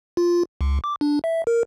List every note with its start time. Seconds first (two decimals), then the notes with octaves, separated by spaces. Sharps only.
0.17 F4
0.61 C#2
0.84 D6
1.01 D4
1.24 E5
1.47 A#4